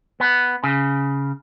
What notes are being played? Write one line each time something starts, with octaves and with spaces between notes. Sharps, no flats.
B3
C#3